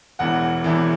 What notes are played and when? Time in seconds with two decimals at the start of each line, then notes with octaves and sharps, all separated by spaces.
0.19 E1 E2 E3 F#5
0.64 E1 E2 E3